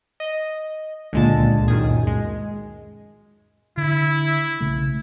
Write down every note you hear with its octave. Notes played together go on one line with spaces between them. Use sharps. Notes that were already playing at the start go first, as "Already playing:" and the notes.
D#5
C#2 A#2 D3 G#3 A5
F#2 D#3 G#4
G#3
D3 E4
B1 C#3 A3